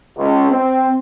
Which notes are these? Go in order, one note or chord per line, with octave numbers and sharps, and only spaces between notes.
C#2
C4